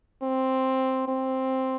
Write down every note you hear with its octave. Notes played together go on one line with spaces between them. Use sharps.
C4
C4